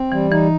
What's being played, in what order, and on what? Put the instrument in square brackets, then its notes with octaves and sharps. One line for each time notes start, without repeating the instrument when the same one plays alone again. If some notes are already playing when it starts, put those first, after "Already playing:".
Already playing: [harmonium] C4
[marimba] E3 [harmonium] G3
[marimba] E3 [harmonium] D#4